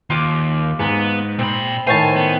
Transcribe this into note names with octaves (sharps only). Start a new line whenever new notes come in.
D#2 F4 D6
G#2 B3
A#2 C4 B5
A2 D#3 C5 C#5 G#5 A5
B3